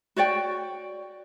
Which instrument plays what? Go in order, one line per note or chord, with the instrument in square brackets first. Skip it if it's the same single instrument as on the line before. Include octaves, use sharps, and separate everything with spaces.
[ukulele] F#4 C#5 D5 G5